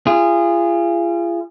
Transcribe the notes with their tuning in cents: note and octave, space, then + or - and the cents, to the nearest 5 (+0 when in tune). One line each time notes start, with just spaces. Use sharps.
F4 -35 G#4 -20